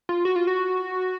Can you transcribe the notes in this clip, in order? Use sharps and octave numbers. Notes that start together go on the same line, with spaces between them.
F4
F#4
F4
F#4